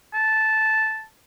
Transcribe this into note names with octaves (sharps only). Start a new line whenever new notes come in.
A5